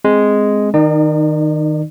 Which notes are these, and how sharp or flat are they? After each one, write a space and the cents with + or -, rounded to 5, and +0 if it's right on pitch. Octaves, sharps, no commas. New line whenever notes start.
G#3 +0 C4 +0
D#3 +0 D#4 -25 D5 +40